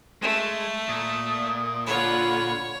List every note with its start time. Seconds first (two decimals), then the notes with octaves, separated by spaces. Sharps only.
0.22 G#3 A3
0.89 A#2 D#6
1.87 D3 F4 C#5 F#5 B5